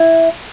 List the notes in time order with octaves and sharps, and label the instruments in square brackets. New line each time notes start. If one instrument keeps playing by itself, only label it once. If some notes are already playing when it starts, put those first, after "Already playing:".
Already playing: [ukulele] E4